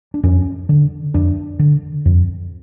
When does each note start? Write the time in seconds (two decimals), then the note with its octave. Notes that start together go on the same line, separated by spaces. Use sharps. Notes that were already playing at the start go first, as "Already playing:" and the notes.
0.14 D4
0.23 F2 C#4
0.69 D3
1.14 F2 D4
1.59 D3
2.05 F2